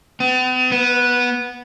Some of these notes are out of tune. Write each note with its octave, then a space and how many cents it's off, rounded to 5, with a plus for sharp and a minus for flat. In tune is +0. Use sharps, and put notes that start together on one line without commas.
B3 +45
B3 -10